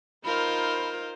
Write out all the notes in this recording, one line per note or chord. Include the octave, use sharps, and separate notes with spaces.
D#4 F4 A#4 C5 B5